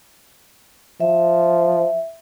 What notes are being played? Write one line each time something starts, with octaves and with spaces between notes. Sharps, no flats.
F3 E5